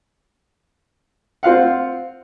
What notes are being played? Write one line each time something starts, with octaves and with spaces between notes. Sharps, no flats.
C4 F4 F5 F#5